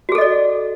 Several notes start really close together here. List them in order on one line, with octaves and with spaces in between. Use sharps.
F#4 G#4 A4 D#5 D5